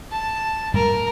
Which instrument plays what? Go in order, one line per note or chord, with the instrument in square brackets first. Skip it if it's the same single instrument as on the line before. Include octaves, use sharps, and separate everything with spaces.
[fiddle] A5
[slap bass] G2 G3 A3 [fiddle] A#4